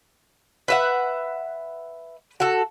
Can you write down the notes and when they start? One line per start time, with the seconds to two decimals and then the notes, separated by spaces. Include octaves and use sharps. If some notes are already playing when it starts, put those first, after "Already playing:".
0.68 B4 E5 F#5
2.40 F#4 A4